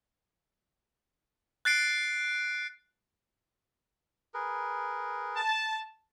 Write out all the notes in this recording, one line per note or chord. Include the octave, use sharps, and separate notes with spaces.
F#6 A6 C7 D7
G#4 A#4 B4
A5